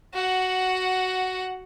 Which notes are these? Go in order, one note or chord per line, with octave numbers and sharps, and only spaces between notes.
F#4 F#5